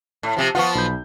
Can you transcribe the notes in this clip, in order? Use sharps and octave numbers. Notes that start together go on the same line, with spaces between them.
A2
C3 F3
F3 B3 F4 F#5 C#6
B1 B5 G6